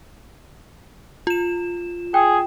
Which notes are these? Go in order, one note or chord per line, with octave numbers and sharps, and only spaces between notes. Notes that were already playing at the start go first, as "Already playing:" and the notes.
F4 E7
G#4 G5